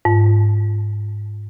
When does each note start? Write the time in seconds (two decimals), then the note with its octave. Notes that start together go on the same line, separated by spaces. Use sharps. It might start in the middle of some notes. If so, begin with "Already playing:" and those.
0.05 G#2